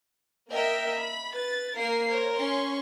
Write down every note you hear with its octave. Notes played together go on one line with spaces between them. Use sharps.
A#3 A#4 D#5 E5 G5
B5
B4 A6
A#3 A#4 C7
A#4 C5 C#5
C#4 C6 C#6